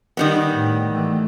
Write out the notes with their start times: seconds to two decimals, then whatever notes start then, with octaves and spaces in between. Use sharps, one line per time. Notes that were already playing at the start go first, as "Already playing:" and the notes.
0.17 D#3 G3 B3
0.50 A2
0.92 E3 A3